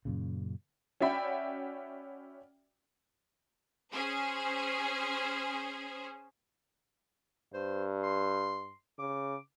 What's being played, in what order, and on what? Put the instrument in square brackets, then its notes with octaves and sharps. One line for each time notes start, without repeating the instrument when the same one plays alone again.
[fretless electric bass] F#2 A#2 C#3
[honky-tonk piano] C#4 F#4 D5 E5 G5 B5
[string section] C#4 G#4 C5
[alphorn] G2 [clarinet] C5
[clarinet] C6
[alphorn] C#3 [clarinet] D6